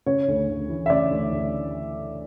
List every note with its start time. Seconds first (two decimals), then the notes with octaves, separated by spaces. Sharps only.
0.06 C#3 C#5
0.28 D2
0.49 D2
0.69 E3
0.86 E5
0.90 C#3 D5
1.10 D2
1.32 D2